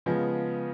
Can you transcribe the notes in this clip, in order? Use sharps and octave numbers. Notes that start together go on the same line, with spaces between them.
C#3 F3 G#3 B3